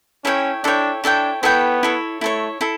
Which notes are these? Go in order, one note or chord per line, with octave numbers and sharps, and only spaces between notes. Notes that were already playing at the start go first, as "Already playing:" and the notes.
C#4 E4 A4 C#5 G5
D4 E4 A4 C#5 G5
D4 E4 A4 C#5 G5
B3 E4 A4 C#5 G5
E4 A4 C#5
A3 E4 A4 C#5
E4 A4